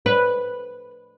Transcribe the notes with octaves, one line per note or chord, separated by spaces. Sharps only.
B4